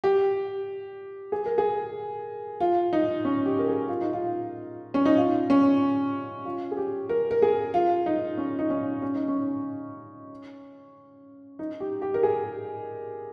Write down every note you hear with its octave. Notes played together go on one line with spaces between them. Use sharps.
G4
G#4
A#4
G#4
F4
D#4
C#4
G4
A#4
G#4
F4
D#4
F4
C#4
D#4
F4
C#4
F4
G#4
G4
A#4
A#4
G#4
F4
D#4
C#4
D#4
C#4
C#4
D#4
C#4
D#4
G4
G4
A#4
G#4